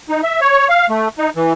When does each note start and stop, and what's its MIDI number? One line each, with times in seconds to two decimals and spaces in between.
0.09 0.21 63
0.23 0.40 76
0.41 0.68 73
0.69 0.87 77
0.89 1.08 57
1.19 1.30 63
1.36 1.53 52